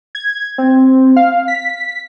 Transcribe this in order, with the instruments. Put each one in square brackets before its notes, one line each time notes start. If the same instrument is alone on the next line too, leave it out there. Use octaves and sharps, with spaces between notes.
[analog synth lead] G#6
C4
F5
B6